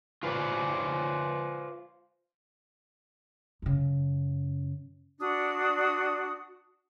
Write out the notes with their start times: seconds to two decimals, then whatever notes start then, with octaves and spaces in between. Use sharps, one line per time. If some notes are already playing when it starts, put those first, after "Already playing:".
0.23 F4 B4 C5 D5
3.62 F#2 C#3
5.20 D4 F#4 D5 D#6